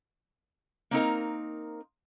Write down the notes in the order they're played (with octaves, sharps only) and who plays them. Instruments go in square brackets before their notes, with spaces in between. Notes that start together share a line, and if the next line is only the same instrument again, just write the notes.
[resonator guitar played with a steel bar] A#3 C4 D#4 A#4